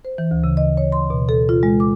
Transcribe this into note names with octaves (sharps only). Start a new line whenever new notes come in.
C5
E3
D2
C#3
D#5
C#5
C6
B2
A4
F4
G#3
D6